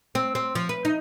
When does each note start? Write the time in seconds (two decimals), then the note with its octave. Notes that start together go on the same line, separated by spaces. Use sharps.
0.15 C4
0.35 C4
0.55 F3
0.69 B4
0.85 D#4